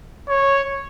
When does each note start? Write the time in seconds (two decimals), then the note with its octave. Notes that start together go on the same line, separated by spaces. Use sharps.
0.29 C#5